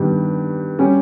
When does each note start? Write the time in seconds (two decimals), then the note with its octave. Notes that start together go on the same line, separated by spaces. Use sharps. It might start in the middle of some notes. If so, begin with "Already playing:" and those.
Already playing: G2 D#3 G3 B3 G4
0.79 G3 C#4 G4